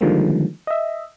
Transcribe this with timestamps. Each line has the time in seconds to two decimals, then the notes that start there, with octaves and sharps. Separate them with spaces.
0.01 D3 D#3 F3 G3 G#3 A#3
0.67 D#5 E5